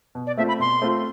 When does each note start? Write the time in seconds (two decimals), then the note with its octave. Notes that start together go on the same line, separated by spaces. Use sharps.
0.15 B2
0.27 D5
0.38 A3 C4 F4 E5
0.48 B5
0.60 B2 C6
0.82 A3 C4 F4